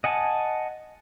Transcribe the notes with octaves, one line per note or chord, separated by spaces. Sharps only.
D#5 F#5 G#5 A5